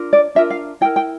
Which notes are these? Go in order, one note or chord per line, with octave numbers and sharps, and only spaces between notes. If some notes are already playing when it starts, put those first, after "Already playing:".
Already playing: D4 F4 A#4
D5
D4 F4 A#4 E5
F5
E4 A#4 G5
G5